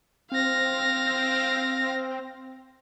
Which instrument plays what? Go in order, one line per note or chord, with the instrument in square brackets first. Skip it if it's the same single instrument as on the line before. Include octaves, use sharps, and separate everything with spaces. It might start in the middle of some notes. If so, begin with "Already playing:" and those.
[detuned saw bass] C4 [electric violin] F5 A#6